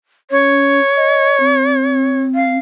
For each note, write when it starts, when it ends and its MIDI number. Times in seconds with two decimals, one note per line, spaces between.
0.31 0.80 61
0.31 2.22 73
0.96 1.39 75
1.40 2.59 60
2.35 2.58 77